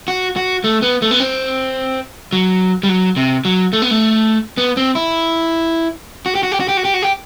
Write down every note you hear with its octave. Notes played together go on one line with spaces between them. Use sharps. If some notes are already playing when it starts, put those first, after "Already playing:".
F#4
F#4
A3
B3
A3
B3
C4
F#3
G3
F#3
C3
F#3
A3
B3
A3
B3
C4
E4
F#4
G4
F#4
G4
F#4
G4
F#4
G4
F#4
G4